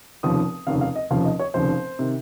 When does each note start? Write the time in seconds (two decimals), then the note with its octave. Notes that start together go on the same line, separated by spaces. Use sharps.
0.23 F1 D#2 C#3 F3 D#6
0.67 F1 D#2 C#3 F3 F5
0.81 F5
0.96 D#5
1.10 F1 D#2 C#3 F3 F5
1.25 D#5
1.39 C#5
1.54 F1 D#2 C#3 F3 C5
1.99 C3 D#3